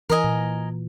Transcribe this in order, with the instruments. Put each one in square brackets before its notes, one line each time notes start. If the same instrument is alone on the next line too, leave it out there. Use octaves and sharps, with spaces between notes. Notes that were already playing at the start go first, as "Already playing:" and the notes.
[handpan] E3 [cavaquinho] A#4 D#5 G#5
[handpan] A#2